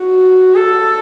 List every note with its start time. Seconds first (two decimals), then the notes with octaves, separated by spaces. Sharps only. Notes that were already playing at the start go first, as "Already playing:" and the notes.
Already playing: F#4
0.55 A4